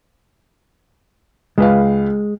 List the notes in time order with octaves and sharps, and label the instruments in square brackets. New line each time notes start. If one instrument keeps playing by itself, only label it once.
[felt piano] C#2 B4 F5 [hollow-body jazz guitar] G#3